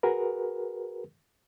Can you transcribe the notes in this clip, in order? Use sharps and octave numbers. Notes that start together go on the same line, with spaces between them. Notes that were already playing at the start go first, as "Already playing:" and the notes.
F#4 G#4 A#4 B4